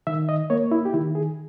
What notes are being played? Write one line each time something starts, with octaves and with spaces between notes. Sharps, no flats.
D#3 E5
D#5
A#3 C#5
E4
G4
D#3 E4
G#4